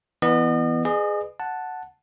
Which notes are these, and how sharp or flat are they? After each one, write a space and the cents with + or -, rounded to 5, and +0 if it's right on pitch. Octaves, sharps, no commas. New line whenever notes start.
E3 +0 B3 +0 D#5 -40
G#4 +0 B4 +20 D#5 -40
F#5 +0 A5 +0